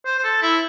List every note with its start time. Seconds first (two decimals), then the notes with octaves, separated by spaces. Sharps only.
0.06 C5
0.18 C5
0.24 A4
0.42 E4